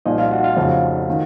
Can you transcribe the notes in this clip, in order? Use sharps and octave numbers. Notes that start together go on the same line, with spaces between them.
C2 A#2 F3 D#4 D#5
F4 F5
F#4 F#5
F4 F5
F1 F2 C#3
D#3